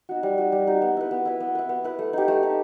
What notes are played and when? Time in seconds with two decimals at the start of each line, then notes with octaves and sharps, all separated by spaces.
0.09 D#4 F#4
0.23 G3
0.38 D#4 F#4
0.52 G3
0.67 D#4 F#4
0.82 B3
0.97 E4 B4
1.11 B3
1.25 E4 B4
1.40 B3
1.55 E4 B4
1.69 B3
1.84 E4 B4
1.99 A3
2.13 D#4 G4
2.28 A3
2.43 D#4 G4